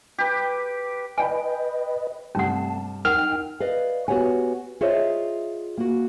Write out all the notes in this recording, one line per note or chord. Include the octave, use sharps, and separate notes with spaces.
G4 B4
B4 D5 D#5 G5 G#5 B5
G2 C3 G3 A3 C#4 F#5 A5
D#4 A#4 F#5 G5 F6
B4 D5 D#5 F5
B3 F#4 G4 C#5 F#5 G#5
F4 G#4 C5 C#5 D#5 E5
A#3 F#4